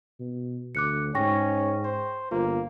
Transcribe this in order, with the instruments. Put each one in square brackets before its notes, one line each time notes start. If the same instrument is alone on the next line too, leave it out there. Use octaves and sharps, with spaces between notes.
[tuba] B2
[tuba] D2 [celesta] D6 F#6 C#7
[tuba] G#2 [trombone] C#4 [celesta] G5 C#6 A#6
[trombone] C5
[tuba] G1 [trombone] A#3 [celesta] F4